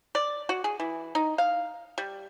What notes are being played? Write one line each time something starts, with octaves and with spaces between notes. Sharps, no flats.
D5
F#4
G#4
E3
D#4
F5
G3